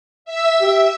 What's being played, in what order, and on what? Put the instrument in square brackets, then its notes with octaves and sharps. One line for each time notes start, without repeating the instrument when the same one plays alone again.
[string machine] E5 E6
[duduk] G4 [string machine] E5